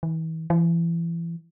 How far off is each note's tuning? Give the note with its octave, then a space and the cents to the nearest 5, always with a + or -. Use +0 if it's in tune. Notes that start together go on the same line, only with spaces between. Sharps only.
E3 -40
E3 +30